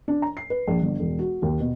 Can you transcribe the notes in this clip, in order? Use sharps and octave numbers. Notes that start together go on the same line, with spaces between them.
D4
A#5
C7
B4
A#1
G1
E1
F#4
D#2
B2